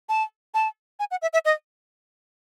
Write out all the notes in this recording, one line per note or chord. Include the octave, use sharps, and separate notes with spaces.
A5
A5
G#5
F#5
E5
E5
D#5